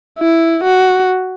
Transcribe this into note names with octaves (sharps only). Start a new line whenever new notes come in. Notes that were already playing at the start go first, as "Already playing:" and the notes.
E4
F#4